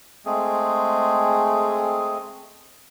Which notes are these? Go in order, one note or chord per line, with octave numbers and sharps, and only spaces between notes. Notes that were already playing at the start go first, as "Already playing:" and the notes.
G#3 A3 C4 G#4